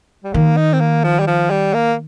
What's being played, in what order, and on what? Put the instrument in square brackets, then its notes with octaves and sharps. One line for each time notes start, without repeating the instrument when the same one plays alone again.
[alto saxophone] G3
[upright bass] D#3 [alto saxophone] A#3
[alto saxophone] D#4
C4
A#3
F3
G3
F3
G3
A#3